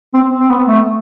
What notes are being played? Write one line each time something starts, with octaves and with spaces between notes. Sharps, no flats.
C4
C4
B3
A3